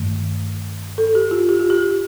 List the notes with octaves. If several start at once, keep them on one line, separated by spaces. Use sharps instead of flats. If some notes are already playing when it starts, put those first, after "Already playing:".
Already playing: G2 D#3 A3
A4
G4
F4
G4
F4
G4